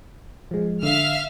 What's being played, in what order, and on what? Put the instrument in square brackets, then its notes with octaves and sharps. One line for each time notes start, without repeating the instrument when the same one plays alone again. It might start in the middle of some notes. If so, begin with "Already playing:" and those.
[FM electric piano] F3 G#3
[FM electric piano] D3 [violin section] E5 F5 F6